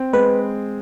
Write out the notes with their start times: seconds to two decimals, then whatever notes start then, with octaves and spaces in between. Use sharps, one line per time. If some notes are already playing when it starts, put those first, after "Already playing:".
Already playing: C4
0.13 G#3 B4